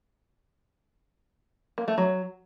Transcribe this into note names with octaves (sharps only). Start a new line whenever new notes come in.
A#3
A3
F#3